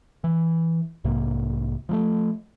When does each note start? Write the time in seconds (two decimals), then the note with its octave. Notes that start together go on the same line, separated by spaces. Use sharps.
0.24 E3
1.04 B1 G#2 C3 A#3
1.89 F3 F#3 A3